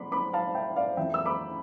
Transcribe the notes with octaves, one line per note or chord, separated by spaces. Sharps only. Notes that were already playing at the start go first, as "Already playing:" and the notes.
Already playing: D3 F3 B5 C6 D6
B5 D6
F5 A5
E5 G5
D5 F5
F2 E3 E5 G5
E6
B5 D6